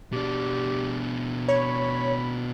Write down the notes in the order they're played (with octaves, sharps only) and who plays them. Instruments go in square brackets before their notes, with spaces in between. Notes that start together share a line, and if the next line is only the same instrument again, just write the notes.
[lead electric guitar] B2 D4 [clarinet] G4
[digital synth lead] C#5 [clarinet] B5